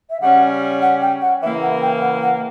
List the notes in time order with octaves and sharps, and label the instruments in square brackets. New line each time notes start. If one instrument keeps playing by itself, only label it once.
[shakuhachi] E5
[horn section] C#3 G3 C#4 [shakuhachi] F#5
[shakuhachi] F#5
G5
F#5
[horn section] C#3 E3 A#3 E4 [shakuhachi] E5
[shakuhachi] F#5
G5
F#5
F#5